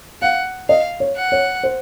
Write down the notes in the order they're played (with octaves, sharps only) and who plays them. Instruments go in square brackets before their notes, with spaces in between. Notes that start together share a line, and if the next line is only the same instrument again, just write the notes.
[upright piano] F5 [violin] F#5
[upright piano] D#5 [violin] F5
[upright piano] C#5
[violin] F#5
[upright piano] C#5
C5